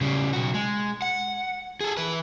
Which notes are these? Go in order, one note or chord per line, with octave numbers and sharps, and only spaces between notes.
C#3 G3
B1 F#4
G#3
F#5
G#4 A4
E3 B4